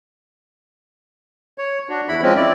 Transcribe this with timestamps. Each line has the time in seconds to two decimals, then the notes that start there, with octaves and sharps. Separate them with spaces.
1.58 C#5
1.89 D4 F#4
2.08 E2 E4 B5
2.22 F3 G#3 C4 C#4
2.36 E4 D5